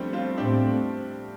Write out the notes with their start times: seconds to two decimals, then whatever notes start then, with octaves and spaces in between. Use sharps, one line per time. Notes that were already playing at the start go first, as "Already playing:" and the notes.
Already playing: F3 G3 A3 C4 D4
0.13 C4 F4
0.37 A2 A3 C4 D4 G4